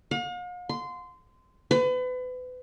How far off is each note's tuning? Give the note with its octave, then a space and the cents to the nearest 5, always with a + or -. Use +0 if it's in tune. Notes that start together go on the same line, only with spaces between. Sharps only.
F5 +45
C6 -20
B4 +35